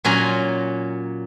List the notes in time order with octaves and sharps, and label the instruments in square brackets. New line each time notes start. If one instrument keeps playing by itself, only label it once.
[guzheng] A#2 F#3 C#4 A#5